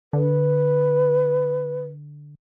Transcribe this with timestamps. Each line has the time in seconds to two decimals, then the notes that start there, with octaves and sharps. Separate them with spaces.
0.13 D3 B4